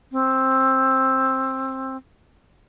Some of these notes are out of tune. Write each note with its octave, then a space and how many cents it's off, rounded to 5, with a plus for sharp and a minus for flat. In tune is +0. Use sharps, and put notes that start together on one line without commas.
C4 +15